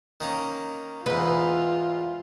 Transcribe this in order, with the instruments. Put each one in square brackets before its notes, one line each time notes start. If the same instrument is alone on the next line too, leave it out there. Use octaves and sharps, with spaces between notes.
[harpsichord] D#3 A#3 C#4
[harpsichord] E2 G#2 [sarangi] F4 [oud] B4